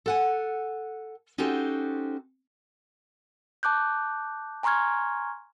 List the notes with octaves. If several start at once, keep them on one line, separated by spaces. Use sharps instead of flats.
A4 F#5 G#5
C#4 D#4 F#4 G4 A4 C5
A5 D6 F#6 G6
G#5 A#5 C6 C#6 F6 G#6